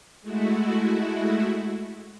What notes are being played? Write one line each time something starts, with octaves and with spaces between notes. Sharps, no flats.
G#3 A3 E4 F#4